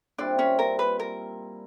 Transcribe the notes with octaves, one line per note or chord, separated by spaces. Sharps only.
A#2 G3 C4 D4 E4 D5
C#4 C#5
A#4
B4
A#4